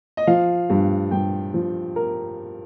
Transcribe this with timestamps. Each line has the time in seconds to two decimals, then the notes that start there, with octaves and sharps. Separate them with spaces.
0.17 D#5
0.27 F3 F5
0.70 G2
1.11 G2 G5
1.54 F3
1.96 A#4